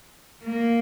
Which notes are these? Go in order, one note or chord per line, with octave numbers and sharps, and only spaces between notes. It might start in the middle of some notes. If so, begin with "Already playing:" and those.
A#3